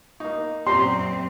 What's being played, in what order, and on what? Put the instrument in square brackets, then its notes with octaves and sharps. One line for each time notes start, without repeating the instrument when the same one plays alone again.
[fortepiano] A#3 D#4
[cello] F#2 C4 [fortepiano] A#2 G4 A#5 [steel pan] C6